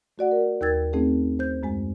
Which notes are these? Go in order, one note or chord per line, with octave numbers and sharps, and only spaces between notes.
A3 F#4 D5 F#5
A#4
D#2 A#4 G5 E6 G#6 A6
A3 C4 C#4 D#4 G#4
C5 G6
F#2 G#3 G#5